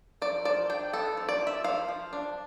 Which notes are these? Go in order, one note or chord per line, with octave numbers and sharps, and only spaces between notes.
F3 D5
F3 D5
D4 G5
B3 A4
F3
D5
F3
E5
F3 F5
F3
D4